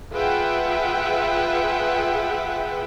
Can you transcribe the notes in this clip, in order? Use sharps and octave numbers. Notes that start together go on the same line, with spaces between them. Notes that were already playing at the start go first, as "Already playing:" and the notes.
F4 G#4 B4 E5 F#5 G5